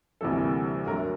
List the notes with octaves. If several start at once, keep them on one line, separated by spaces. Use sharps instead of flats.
D2 C3 E3 G3 A#3 A4
D2 D3 F#3 A3 A#4